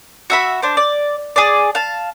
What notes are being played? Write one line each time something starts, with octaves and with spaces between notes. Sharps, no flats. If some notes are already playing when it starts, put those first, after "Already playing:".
F#4 E5 B5
D4 C5
D5
G#4 D5
F5 A5